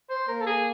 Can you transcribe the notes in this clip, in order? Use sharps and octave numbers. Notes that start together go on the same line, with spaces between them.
C5
A#3 A#4
A4
G#4